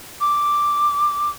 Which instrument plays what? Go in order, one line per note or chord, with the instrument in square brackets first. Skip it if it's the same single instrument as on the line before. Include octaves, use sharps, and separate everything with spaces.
[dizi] D6